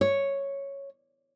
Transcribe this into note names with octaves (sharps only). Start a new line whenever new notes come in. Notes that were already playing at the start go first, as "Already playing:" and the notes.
C#5